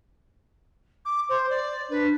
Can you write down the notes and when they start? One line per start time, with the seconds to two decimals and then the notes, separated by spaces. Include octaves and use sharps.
1.05 D6
1.29 C5
1.50 D5
1.90 D4 B4